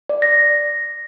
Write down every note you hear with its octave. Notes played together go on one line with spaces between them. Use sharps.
D5
A#6